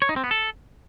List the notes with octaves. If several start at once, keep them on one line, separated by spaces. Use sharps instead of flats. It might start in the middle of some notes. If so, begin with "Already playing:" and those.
C#5
D#4
C4
B3
A4